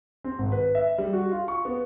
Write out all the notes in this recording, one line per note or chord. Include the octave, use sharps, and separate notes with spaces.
C4
G#1
B4
E5
G3
F#4
F4
C#6
B3